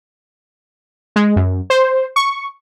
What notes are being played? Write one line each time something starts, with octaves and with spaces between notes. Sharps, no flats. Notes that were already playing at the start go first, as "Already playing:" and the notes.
G#3
F#2
C5
C#6